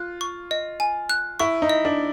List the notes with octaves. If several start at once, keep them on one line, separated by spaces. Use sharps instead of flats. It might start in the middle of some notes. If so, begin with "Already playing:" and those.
Already playing: F4 F#6
C#6
D#5
G#5
F#6
E4 C#6
D#4
D#5
D4